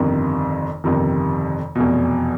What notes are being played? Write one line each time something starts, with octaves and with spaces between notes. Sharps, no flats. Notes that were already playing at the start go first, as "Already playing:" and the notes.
Already playing: G1 F2 C3 D#3
G1 F2 C3 D#3
F1 E2 B2